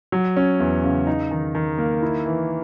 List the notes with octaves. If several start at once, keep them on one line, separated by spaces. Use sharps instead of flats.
F#3
C#4
E2
C#3
D#4
D#3
D#3
A#3
E4
E3